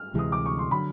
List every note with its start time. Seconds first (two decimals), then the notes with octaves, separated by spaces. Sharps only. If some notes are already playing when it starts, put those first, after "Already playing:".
Already playing: F6
0.14 D2 C3 E3 G#3 D#6
0.32 D6
0.46 C#6
0.58 C6
0.71 D3 F#3 B5